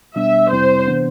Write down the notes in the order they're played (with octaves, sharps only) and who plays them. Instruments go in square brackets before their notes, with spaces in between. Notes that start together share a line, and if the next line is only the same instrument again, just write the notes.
[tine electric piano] B2 G3 B3 D4 [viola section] E5
[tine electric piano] F2 C3 G3 C4 E4 [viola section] C5
[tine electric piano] C3 E3 B3 D4